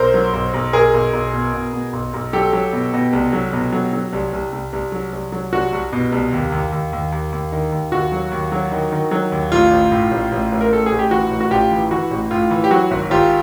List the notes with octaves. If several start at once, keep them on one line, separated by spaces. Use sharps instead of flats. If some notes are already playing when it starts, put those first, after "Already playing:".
Already playing: B1 A#4 C5
F#3
B1
B1
B1 G#4 A#4
B1
B1
B2
B2
B2
B1
B1
F#3 G4 A4
F#3
B2
B2
C2
F#3
B2
F#3
F#3
C2
C2
C2
C2
F#3
C2
F#3
C2 F#4
C2
B2
C2
D#2
D#2
D#2
D#2
D#2
D#2
D#3
D#2
D#2 F#4
F#3
D#2
F#3
D#3
D#3
F#3
D#2
A1 F4
A1
A2
A1
A1
A1
A#4
A1 A4
G#4
A1
G4
E3 F#4
A1
F#4
A1 F4 G4
E3
E3 F#4
A1
A2 F4
E3
G4
F#3 F#4
G#1
G#1 F4 G4